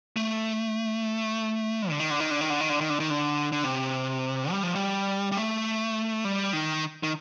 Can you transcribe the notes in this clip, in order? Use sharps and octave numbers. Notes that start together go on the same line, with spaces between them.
A3
D3
D#3
D3
D#3
D3
D#3
D3
D#3
D3
D#3
D3
D#3
D3
D3
C3
G3
F3
G3
G3
A3
G3
D#3
D#3